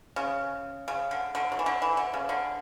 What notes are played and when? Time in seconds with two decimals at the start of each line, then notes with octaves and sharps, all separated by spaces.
0.16 C#3
0.88 C#3
1.11 D3
1.35 D3
1.52 F#3
1.59 E3
1.66 D3
1.82 E3
1.97 D3
2.14 C#3
2.29 D3